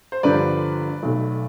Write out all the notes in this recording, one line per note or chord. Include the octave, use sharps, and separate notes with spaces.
C5
G1 G2 D3 F3 B4 D5
B1 B2 A3